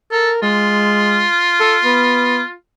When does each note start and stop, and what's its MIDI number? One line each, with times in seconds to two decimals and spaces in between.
0.11 0.31 69
0.11 0.42 70
0.42 1.25 56
0.42 2.54 65
1.60 1.77 69
1.84 2.41 59